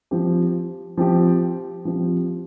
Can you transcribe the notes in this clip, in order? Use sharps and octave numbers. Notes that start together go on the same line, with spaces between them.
F3 C4 G4
F3 C4 G4
F3 C4 G4